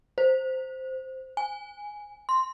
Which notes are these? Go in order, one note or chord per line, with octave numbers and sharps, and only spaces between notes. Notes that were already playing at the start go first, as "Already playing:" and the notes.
C5
G#5
C6